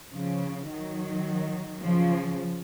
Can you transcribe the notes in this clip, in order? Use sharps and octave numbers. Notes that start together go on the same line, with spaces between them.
C#3 F3
D#3 F#3
C#3 F3